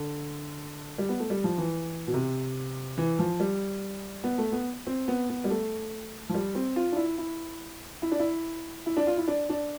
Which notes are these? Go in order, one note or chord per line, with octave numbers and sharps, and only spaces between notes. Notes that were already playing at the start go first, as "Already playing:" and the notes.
Already playing: D3
G3
B3
A3
G3
F3
E3
B2
C3
E3
F3
G3
B3
A3
B3
C4
B3
B3
G3
A3
F3
G3
C4
F4
D4
E4
E4
E4
D4
E4
E4
D4
F4
E4
D4
D4